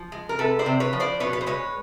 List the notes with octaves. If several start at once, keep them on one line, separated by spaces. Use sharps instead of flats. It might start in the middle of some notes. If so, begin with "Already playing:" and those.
Already playing: F3
G#3
A#4
C3 A4 B4
C5 D5
C3
B4 C#5
F3
C5 D5
B2 B4 C#5
B4
C5
G#3 B4 C#5